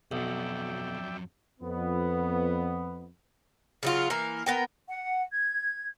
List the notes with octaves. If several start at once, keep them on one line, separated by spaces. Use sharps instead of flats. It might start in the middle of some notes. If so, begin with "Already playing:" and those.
B1 F2 F#3 D5 E5 G5
F2 B3
C#3 F#3 F4
E3 A#3 A#4
B3 A#4 G5
F#5
G#6